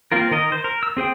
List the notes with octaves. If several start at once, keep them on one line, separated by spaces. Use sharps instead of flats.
A#3 C4 F4 A#4
D#3 A#4 D#5
C5
A#4
E6
C4 G#4 C5 G5